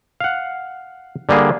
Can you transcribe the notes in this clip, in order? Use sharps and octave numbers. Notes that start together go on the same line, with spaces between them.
F5 F#5
D3 G3 A#3 G#4